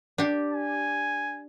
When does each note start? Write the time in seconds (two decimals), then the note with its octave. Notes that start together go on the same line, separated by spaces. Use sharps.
0.18 D4 G4
0.53 G#5